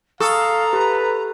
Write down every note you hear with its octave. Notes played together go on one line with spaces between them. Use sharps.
A4 F5 A#5 C#6 D#6 E6
G4 B4